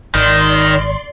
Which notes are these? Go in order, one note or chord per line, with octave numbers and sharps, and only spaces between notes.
G#1 D#3 D5 C6